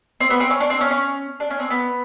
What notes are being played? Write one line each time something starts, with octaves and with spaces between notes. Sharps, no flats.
C4
B3
C4
C#4
D4
C4
C#4
C#4
D4
C#4
C4
B3